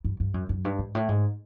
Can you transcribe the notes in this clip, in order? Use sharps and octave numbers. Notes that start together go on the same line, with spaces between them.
G2
G2
F#2
F#2
G2
G#2
A2
G#2